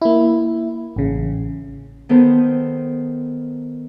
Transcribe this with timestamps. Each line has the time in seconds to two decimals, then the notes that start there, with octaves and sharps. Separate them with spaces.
0.02 A#3 E4
0.96 A1 C#3
2.09 D#3 B3 A4 C5